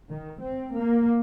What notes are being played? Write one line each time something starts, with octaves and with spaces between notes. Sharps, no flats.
D#3
C4
A#3